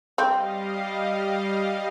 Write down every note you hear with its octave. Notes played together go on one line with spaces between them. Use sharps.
G3 C4 D#5 F5